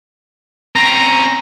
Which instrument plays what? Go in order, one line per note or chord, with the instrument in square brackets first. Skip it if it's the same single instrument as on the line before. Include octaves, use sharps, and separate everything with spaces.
[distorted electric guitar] C4 C#4 [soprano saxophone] A#5